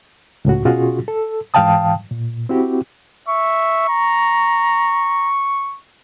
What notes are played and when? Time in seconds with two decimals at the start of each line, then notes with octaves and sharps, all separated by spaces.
0.45 C#2 A2 F#4
0.65 B2 C#4 F4 F#4 G#4
1.08 A4
1.54 G#2 E3 F5 G5 A5 D#6
2.11 A#2
2.49 C4 E4 F#4 G4
3.28 E5 C#6
3.89 A#5